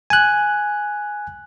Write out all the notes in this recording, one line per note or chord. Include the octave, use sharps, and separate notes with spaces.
G#5 F#6